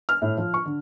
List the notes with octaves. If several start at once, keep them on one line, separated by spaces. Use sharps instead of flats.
F6
A2
F3
C#6
D3